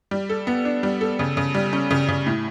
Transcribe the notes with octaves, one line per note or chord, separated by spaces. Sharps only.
G3
A4
B3
D4
G3
A4
C#3
C#3
G3
C#4
C#3
C#3
A2